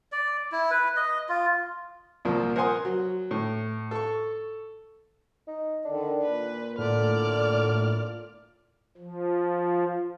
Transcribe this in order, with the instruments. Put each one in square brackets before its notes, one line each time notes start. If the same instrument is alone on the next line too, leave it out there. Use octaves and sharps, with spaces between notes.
[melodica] D5
E4
B4
D#5
F4
[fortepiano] C2 A#2 F3 A#3
A#4 C5 F#5 G#5 C6 D#6
F#3
A2
A4 C#6
[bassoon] D#4
[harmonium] D3 D#3 [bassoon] D4
[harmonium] A#2 [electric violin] B4
[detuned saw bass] A2 [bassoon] D3 [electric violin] D5 F6
[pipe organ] F3